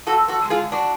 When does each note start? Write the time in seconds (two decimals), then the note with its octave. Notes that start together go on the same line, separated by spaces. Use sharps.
0.06 F2 F#4 A4
0.28 F#4 A4
0.40 D3 G#3
0.50 F4 G#4
0.72 D4 F#4